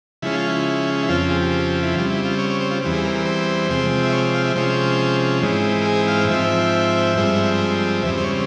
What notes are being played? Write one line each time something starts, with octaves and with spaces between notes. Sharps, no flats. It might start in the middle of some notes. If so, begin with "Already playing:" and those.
C#3 F3 G#3 C#4 E4
F4
E4
E4
F2 C#3 F3 C4 F4
G#4
G4
E4
C#3 G3 C4 F4
E4
F4
C#5
C#5
C5
F4
E2 E3 G3 C4
G#4
A#4
A#4
C5
C3 F3 G#3 C4
E5
C#5
F5
E5
C3 F3 G#3 C#4 C5
G#2 E3 G#3 C4
A#4
G#4
F5
G#2 F3 C4 E5
G2 F3 G#3 C4
E2 C#3 G3 C4 E5
C5
C#5